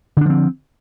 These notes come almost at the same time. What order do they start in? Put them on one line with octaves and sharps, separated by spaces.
D3 D4 F3 C4